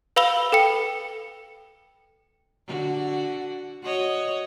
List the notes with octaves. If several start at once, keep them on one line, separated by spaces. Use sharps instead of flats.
B4 F5 B5 E6 F7 G7
A4 G5 C#7
D3 F#4
F#4 C#5 D#5